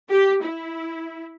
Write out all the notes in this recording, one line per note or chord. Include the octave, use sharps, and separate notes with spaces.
G4
E4